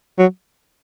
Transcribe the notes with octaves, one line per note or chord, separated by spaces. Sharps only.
F#3